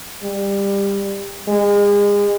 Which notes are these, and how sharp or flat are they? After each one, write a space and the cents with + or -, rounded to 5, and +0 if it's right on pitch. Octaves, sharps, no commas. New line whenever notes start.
G3 +20
G#3 -35